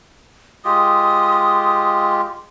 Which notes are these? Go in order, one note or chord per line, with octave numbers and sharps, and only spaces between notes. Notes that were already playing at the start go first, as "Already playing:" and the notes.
G#3 F4 G4 D#6